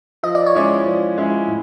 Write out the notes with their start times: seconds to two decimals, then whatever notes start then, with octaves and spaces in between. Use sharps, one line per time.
0.23 F3 D#5
0.35 D5
0.46 C#5
0.55 G#3 C#4 E4 D5
0.86 F3
1.17 G#3 C#4 E4
1.47 A2